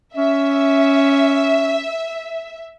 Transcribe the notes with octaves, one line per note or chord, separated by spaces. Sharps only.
C#4 E5